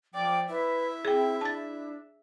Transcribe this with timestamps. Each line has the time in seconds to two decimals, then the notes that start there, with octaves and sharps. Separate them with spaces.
0.14 F3 D5 G5 D6
0.49 E4 B4 E5
1.05 C4 G#4 G5
1.41 D4 A5 A6